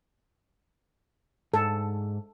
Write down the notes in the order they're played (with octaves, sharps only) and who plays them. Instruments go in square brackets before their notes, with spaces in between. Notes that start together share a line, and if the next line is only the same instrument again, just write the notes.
[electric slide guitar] G#2 [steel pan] A4